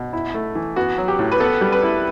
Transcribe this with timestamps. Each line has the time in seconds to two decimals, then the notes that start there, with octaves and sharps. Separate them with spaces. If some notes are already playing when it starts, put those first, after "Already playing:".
Already playing: B2
0.13 E4
0.34 A3
0.55 E3
0.76 B3 F#4
0.98 F#3
1.08 G4
1.19 A2
1.32 B4
1.40 B3 A4
1.61 G3
1.72 B4
1.83 E4